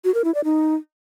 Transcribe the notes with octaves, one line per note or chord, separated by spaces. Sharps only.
F#4
A#4
E4
D5
D#4